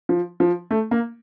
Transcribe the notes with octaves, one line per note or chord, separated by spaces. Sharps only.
F3
F3
A3
A#3